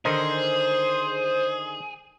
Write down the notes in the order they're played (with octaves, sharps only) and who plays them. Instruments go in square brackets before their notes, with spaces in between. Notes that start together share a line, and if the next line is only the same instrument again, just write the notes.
[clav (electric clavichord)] D3 D#3 D#4 [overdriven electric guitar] G#4 [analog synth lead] C5